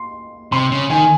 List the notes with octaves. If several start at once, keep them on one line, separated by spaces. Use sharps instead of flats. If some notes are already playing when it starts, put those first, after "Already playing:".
Already playing: C6
C3 C6
C#3
D#3 G#5